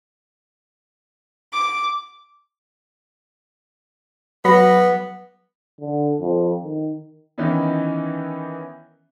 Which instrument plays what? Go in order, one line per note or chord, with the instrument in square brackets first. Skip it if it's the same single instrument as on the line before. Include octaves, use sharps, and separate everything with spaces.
[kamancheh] D6
[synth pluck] F#3 B5 A#6 [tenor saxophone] B3
[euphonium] D3
F2
D#3
[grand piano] D#3 E3 B3 C#4 D#4 E4